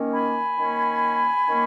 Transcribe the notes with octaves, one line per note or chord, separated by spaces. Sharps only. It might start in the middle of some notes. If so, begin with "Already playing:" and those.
Already playing: D#3 A#3 C#4
G#5 B5
D#3 A#3 C#4
D#3 A#3 C#4